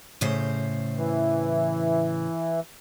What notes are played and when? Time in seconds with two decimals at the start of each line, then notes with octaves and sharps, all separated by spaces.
0.21 A2 C#3 C5
0.97 E3